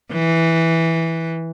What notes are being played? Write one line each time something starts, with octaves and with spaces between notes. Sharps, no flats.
E3